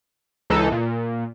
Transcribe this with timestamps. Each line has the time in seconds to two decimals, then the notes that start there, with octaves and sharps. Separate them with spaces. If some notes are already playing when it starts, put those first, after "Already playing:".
0.50 C#2 E3 D#4 A4
0.72 A#2